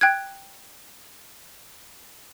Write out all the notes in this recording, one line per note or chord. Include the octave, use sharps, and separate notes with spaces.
G5 F#6 G#6